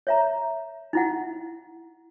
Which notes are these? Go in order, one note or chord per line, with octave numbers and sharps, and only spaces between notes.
C#5 E5 A#5
D#4 E4 F#5